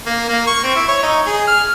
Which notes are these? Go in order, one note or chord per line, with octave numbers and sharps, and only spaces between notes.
A#3
A#3
C#6
C4
E4
C#5
D#4
G#4
F6